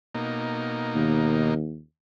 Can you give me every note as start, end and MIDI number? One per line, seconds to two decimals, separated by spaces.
0.14 1.54 47
0.14 1.54 58
0.14 1.54 63
0.95 1.80 39